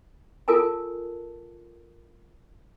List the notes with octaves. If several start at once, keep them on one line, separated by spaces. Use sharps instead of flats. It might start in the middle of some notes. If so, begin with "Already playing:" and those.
F4 A4 A#4 G#5 A5